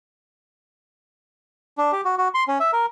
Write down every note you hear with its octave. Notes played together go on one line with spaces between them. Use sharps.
D4
G4
F#4
F#4
C6
C#4
E5
A#4